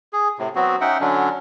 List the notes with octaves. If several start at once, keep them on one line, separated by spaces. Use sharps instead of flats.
G#4
A2 C3
F#3 B3 C4 F#4
C#4 D#4 E5 F#5 G5
D3 F#3 C#4 D4